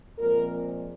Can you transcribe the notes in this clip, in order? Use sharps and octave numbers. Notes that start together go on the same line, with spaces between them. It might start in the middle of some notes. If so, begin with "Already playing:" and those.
A#2 F3 G#3 C4 A#4